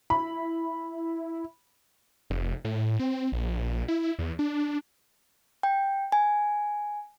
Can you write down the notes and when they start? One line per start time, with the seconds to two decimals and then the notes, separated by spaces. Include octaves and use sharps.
0.10 E4 B5
2.30 F1
2.65 A2
2.99 C4
3.32 A#1
3.88 E4
4.19 E2
4.39 D4
5.63 G5
6.12 G#5